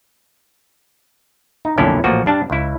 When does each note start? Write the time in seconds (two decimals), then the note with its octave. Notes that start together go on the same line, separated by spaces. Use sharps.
1.65 D#4
1.78 B1 F2 A#2 D3 C#4 E4
2.04 A1 A#2 F3 F#4
2.26 G2 D4 A5
2.50 C#2 E4